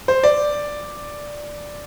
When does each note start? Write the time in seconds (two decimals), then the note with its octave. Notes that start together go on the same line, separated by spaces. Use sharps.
0.08 C5
0.24 D5